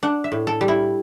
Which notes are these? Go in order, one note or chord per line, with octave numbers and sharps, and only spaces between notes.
D4 F#5
E5
A2
A4
G3
E4